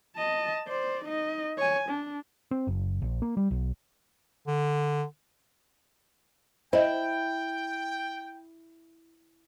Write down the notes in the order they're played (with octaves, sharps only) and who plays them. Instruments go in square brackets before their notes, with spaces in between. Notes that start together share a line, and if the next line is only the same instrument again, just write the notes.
[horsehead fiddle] D#5 A5
C5 D5
D#4 D#5
C#5 G#5
D4
[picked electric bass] C4
F#1
A#1
A#3
G3
B1
[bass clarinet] D3
[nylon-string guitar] E4 [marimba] C5 D#5 [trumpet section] G5